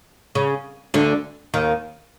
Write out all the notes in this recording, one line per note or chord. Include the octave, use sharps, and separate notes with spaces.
C#3
D2 D3
D#2 D#3